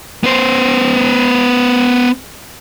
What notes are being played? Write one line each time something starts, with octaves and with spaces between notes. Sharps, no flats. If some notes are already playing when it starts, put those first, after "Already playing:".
B3 C5